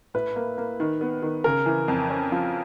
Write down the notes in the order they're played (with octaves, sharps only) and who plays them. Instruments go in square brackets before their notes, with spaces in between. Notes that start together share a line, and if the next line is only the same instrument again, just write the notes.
[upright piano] A2 [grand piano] B4
[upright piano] A#3
A#3
D#3
B3
D#3
[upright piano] C#3 [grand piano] A#4
[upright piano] E3
F2
C#4
F3